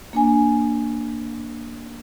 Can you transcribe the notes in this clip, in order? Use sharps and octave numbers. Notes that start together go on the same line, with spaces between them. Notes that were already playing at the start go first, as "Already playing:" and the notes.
A#3 D4 G#5